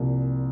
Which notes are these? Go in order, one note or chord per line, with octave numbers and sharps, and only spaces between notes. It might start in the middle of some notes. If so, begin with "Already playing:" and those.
Already playing: C2 A#2 F3 A#3